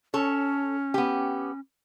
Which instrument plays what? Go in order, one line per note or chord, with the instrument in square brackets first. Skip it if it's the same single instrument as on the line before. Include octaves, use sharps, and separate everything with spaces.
[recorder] C#4 [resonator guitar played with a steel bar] A4 C#5
[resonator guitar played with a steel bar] B3 G4